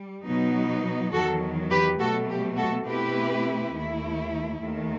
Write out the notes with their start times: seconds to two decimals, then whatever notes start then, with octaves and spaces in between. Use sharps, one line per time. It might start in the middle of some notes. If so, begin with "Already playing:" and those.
Already playing: G3
0.25 B2 F#3 B3 D#4
1.12 E2 D#3 F#3 F#4 A4
1.70 G4 B4
1.99 B2 F#3 A3 F#4 A4
2.29 G4
2.56 F#4 A4
2.85 B2 A3 C4 E4 G4 B4
3.73 D#2 D#3 A3 E4
4.60 D#2 D#3 A3